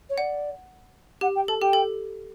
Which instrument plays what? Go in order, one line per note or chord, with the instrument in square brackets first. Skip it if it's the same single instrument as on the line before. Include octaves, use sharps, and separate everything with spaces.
[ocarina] C#5
[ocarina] D5 [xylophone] F#5
[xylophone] G4 [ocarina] F#5
[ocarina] G5
[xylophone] A4 [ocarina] A5
[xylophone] G4 [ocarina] G5
[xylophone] A4